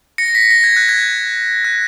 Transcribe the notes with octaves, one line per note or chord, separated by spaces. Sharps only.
A#6 C#7
B6
A#6
G#6
F#6
G#6
F#6